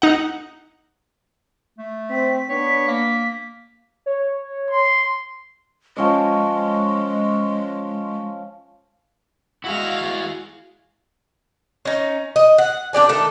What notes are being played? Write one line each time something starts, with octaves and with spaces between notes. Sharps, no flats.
D#4 F#5
A3
C4 B6
B3 D4 C#5
A#3
C#5
C6
F3 G#3 C#4 D#5
G#3 E4 F#4 G#4 F5
C#4 D#4
D#5
F#5
D4 G4 D5 G#5
D#3 A3 A4